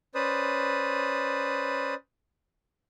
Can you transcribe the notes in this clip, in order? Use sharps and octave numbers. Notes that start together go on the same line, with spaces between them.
C#4 B4 C5 D5 D#6